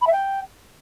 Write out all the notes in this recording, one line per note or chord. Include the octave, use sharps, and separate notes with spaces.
B5
E5
G5